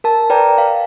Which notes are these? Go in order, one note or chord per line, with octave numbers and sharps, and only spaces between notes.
A#4 A5
B4 D5 G5 A#5
F5